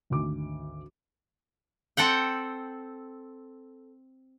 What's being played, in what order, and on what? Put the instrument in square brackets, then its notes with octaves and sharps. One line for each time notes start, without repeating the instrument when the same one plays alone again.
[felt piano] G#1 D2 D6
[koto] C4 A4 F#5 G5